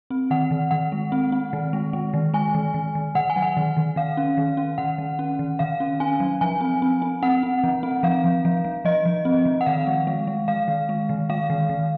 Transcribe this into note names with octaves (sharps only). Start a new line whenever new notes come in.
C4
D#3 F#5
D#3
D#3 F#5
G#3
C4
C4
D#3
G#3
G#3
D#3
G#3 G#5
D#3
D#3
D#3
D#3 F#5
G#5
F#3
F#5
D#3
D#3
D#3 F5
C#4
D#3
C#4
D#3 F#5
D#3
C#4
D#3
D#3 F5
C#4
C#4 G#5
F#3
F3 G#5
C4
C4
C4
C4 F#5
C4
F3
C4
F3 F5
F3
F3
F3
F3 D#5
F3
C4
F3
F#5
D#3 F5
G#3
G#3
G#3
D#3 F5
D#3
G#3
D#3
G#3 F5
D#3
D#3